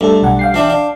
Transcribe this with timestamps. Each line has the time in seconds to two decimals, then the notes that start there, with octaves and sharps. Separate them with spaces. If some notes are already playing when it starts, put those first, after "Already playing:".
0.01 G2 A3 A4
0.23 B1 F#5
0.39 F5 G5 C7
0.54 E3 D4 E4
0.70 D4